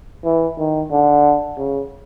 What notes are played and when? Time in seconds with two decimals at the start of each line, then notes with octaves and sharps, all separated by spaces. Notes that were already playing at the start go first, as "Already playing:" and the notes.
0.25 E3
0.58 D#3
0.92 D3
1.58 C#3